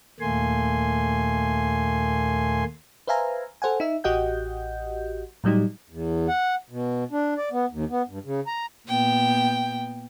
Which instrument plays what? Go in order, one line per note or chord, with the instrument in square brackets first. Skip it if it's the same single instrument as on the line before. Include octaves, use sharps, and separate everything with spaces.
[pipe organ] D#2 A#2 A3 A#3 G#5 C6
[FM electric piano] B4 C5 E5 F5 G#5 A#5
A4 C5 F#5 G#5
D#4 E5
A1 F#4 G4 D#5 F#5 G6
A2 F#3 G3 D#4 G4
[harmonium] E2
F#5
B2
D4
D5
B3
D#2
B3
G2
C#3
A#5
[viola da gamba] A#2 B3 [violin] G5